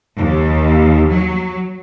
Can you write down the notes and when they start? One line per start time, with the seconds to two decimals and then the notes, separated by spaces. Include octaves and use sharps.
0.17 D#2
1.08 F#3